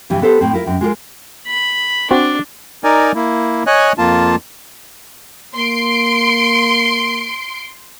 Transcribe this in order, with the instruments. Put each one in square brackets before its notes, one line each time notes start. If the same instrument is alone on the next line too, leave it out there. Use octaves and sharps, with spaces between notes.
[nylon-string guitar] G2 C3 E3 G3
B3 G4 A4 B4 C5
A2 C4
E4 F4 A#4
F#2 C4
G#3 F4 G4 A#4
[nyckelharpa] B5
[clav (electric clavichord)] C4 F#4 [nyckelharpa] D4
[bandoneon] D#4 A#4 D5 G#5
A#3 E4
C#5 D#5 G#5 F#6
F2 A#3 F4 A5
[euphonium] A#3 [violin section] C6 C7 D7